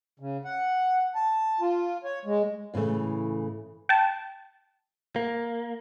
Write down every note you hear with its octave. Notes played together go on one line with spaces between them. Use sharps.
C#3
F#5
A5
F4
C#5
G#3
A2 C#3 E3 A3
G5 A5
A#3